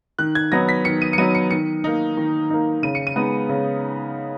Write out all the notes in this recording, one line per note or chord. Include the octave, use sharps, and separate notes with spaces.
D#3 F#6
G#6
F#3 B3 D#4 A#6
B6
D#3 C#7
D#7
C#7
F#3 B3 D#4 D#7
C#7
D#3 C#7
A#3 D#4
D#3
A#3 D#4
C#3 D#7
C#7
D#7
G#3 B3 D#4
C#3